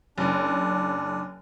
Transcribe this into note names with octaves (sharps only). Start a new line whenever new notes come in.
F#1 D4